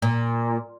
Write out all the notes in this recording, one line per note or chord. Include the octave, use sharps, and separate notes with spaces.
A#2